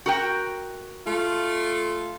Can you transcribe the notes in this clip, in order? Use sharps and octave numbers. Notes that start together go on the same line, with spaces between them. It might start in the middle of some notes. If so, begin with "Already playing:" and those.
F#4 A#4 G5
A3 F4